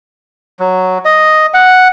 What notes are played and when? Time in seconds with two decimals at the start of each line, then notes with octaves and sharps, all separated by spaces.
0.59 F#3
1.05 D#5
1.54 F#5